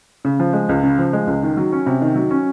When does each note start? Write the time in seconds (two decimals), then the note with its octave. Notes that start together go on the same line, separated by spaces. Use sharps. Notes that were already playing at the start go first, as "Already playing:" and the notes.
0.25 C#3
0.40 F3
0.53 G#3
0.69 C#2
0.83 C#3
0.98 F3
1.13 G#3
1.27 C#2
1.43 D#3
1.57 F#3
1.72 C#4
1.86 C3
2.01 D#3
2.16 F#3
2.31 C#4